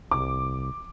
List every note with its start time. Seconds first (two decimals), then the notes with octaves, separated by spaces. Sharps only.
0.11 C2 D6